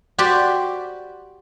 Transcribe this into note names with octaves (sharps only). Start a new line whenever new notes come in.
F#4 G4 C5 D5 B5